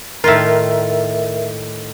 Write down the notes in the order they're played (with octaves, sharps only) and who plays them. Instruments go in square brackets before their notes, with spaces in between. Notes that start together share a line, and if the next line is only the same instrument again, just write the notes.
[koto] A2 D#3 F4 [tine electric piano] A#4 E5